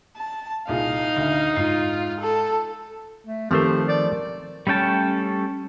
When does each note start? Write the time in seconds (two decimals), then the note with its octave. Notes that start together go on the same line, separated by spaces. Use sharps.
0.17 A5
0.68 C2 A#2 D#4 G#4 F5
1.16 D2
1.56 G#2 F4 C7
2.20 A4
3.26 A3
3.51 D#3 F3 A3 C4 G4 C5
3.88 D5
4.67 G3 A3 C#4 G5 A5